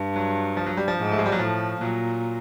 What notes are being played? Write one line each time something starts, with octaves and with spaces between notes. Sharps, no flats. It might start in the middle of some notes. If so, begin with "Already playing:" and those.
Already playing: G2
F#3
F3
F#3
G3
F3
G#2
A3
G#3
G3
F#3
A2 F3
A#2 F#3